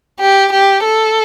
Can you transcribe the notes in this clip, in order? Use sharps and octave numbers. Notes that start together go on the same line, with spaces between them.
G4
G4
A4